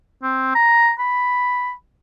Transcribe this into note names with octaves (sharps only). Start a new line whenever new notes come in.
C4
A#5
B5